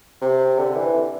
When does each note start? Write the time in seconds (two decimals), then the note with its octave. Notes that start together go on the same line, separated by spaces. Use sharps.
0.22 C3
0.58 D3
0.77 E3